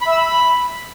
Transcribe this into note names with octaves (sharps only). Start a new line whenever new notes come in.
B5
E5
E6
B5